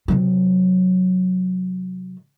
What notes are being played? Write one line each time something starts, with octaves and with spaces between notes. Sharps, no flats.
C3 F#3